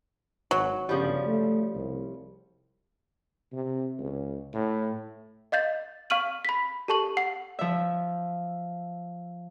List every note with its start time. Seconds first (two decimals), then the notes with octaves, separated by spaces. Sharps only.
0.51 G#1 F#3
0.89 G1 C#3 F3 G3
1.27 A3
1.75 C2
3.53 C3
3.99 C#2
4.54 A2
5.52 D#5 F5 G6 A6
6.10 F5 C#6 F6 D#7 F#7
6.45 B5 B6
6.88 G4 A4 A5 C#6 F#7
7.17 F#5 C7
7.59 F3 E5